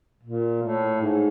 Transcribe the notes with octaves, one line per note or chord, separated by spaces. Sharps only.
A#2
A2
G#2